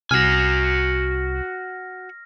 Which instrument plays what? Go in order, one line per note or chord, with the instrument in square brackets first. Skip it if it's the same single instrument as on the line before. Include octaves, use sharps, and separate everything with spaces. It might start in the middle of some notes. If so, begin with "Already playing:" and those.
[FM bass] C2 [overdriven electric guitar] F#4 G#5 [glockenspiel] F6 A#6